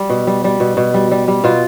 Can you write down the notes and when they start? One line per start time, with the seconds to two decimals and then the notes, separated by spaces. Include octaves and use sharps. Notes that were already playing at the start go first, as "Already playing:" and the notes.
Already playing: G3
0.10 B2
0.27 G3
0.44 G3
0.60 B2
0.77 B2
0.94 G3
1.11 G3
1.28 G3
1.44 B2 F4